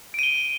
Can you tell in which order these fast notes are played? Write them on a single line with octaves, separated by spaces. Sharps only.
D7 D#7 G7